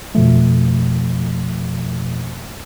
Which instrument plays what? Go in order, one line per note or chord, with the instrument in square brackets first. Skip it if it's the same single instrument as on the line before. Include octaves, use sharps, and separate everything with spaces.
[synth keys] F2 B2 F3 A3